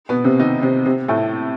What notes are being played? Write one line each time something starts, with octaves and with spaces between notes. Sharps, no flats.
B2 B3
C3 C4
D#3 D#4
C3 C4
C3 C4
A2 A3